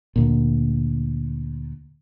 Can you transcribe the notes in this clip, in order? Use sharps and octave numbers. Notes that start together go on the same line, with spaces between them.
D2 A#2